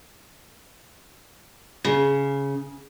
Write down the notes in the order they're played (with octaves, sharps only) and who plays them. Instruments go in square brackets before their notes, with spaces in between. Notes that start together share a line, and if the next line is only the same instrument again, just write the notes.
[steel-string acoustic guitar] C#3